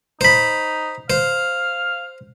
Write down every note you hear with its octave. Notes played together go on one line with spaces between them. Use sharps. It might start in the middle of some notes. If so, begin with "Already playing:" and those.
D#4 C5 B5
C5 F5